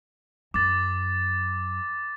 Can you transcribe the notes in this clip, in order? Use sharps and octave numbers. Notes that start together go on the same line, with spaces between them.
F#2 D6 A6